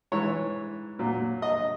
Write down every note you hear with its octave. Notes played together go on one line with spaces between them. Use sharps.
G#2 E3 C#5
A#2 F#3
D#5